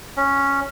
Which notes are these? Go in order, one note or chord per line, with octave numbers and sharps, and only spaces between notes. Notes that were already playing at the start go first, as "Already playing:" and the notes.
C#4